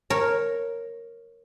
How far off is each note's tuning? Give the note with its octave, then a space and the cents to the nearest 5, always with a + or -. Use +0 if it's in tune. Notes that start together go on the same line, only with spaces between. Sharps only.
A#4 +0 C#5 -10